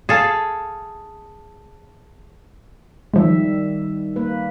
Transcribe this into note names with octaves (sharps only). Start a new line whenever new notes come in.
G#4 A4 F5
D#3 F3 G3 G#3 E5
A#3 B4